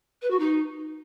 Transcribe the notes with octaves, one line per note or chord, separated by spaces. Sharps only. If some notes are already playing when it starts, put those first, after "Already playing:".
B4
F#4
D#4